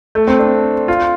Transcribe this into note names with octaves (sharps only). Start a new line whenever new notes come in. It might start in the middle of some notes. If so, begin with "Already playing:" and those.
A3
C4
D4
F4